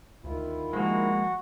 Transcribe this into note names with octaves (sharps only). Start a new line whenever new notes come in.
D2 D#3 E4 F4
F3 G#3 A#3 F#4